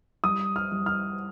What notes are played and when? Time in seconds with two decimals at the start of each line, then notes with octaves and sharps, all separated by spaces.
0.24 G3 D#6
0.56 F6
0.72 G3
0.86 F6